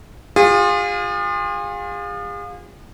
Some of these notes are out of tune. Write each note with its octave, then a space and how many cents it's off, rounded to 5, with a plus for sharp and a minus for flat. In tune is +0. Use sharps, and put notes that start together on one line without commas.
F4 +25 G#4 -40